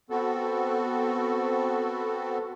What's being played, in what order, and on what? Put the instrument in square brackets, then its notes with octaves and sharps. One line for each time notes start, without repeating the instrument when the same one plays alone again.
[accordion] B3 C4 F#4 A4